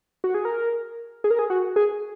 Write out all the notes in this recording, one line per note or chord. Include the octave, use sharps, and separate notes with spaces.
F#4
G#4
A#4
G#4
A#4
G#4
F#4
G#4